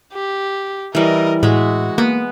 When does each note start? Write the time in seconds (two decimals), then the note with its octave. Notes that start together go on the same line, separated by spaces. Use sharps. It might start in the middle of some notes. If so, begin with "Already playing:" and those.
0.13 G4
0.95 E3 G3 A#4 D#5
1.43 A2 G#3 F#4 E5
1.98 A#3 B3